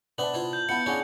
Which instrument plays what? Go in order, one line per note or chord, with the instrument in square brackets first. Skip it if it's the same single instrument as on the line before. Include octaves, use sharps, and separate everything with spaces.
[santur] B3 A5 [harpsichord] D4 C5 E5 [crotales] F#7
[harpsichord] E4 F4 C5
[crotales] G6
[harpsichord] B3 E4 [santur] F5 F#5 A5 [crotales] C#7
[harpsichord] A#3 C#4 E4 [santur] D4 G#4 F#5